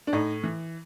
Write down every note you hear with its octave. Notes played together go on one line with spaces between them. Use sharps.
D4
A2 D#4
E3